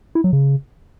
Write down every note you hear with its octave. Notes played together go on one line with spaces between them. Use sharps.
E4
F#3
C#3